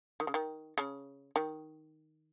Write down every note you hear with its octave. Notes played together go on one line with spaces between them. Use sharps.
D#3
C#3
D#3
C#3
D#3